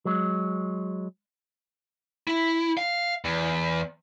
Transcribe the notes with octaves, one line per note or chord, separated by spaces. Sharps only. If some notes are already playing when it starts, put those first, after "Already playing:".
F#3 G#3
E4
F5
E2